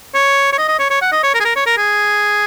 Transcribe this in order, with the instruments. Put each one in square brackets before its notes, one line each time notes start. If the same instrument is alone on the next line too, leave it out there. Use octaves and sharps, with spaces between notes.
[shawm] C#5
C#5
D#5
D#5
C#5
C#5
F#5
D#5
C#5
A#4
G#4
A#4
C#5
A#4
G#4